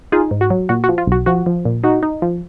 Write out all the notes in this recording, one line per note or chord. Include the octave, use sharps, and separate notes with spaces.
D#4 F4 G#4
G#2
F#4
F#3
A#2 F#4
F#4
F3
F4
B1 F#4
F3 F#4
F3
A#2
D#4 F#4
D#4
F3